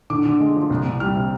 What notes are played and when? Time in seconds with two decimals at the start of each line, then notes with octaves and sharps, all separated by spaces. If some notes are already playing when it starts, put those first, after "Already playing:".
0.10 D3 D6
0.26 D3
0.40 G#3
0.56 F3
0.70 C2
0.85 C2
1.00 G3 F6
1.15 C3